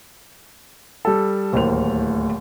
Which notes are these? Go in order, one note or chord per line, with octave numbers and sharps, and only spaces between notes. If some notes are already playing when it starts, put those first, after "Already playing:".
G3 A4
D1 D#2 A2 A#4 C5 F7